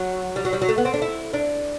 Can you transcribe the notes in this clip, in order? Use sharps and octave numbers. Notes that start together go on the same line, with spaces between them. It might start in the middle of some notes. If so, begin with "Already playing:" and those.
Already playing: F#3
G3
F#3
G3
F#3
A3
B3
C4
D4
E4
D4